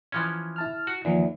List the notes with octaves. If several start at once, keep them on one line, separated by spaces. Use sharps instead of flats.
E3 F3 C#4
E4 A5 F6
F#4
E2 D#3 F3 A#3